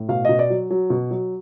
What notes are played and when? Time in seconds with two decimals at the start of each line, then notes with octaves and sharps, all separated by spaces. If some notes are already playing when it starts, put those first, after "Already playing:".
Already playing: A2
0.09 B2 F5
0.25 B2 D#5
0.39 D5
0.50 F#3
0.70 F#3
0.90 B2
1.11 F#3